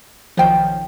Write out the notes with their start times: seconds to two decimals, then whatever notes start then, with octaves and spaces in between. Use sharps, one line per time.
0.37 B1 D#3 F3 C5 G5